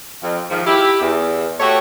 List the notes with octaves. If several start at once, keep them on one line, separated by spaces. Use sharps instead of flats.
F2
G#2 D#3 F3
E4 G4
E2
A3 F#4 G4 C#5